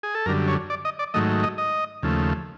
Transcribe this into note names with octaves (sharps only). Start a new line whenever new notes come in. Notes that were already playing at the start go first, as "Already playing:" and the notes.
G#4
A4
F#2 D3 G3 A#4
C#5
D5
D#5
D5
G#2 D#3 F#3 A3 D#5
D#5
D#5
D#2 C#3 F3 A3